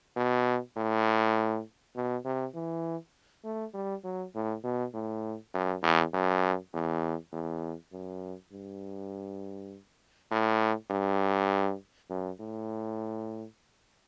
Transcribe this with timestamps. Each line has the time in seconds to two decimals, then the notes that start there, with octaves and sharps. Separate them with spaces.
0.16 B2
0.77 A2
1.96 B2
2.25 C3
2.55 E3
3.44 A3
3.74 G3
4.04 F#3
4.35 A2
4.64 B2
4.94 A2
5.54 F#2
5.83 E2
6.14 F#2
6.73 E2
7.32 E2
7.92 F#2
8.52 G2
10.31 A2
10.90 G2
12.10 F#2
12.40 A2